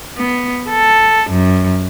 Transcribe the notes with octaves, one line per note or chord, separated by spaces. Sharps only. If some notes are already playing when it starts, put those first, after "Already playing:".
B3
A4
F#2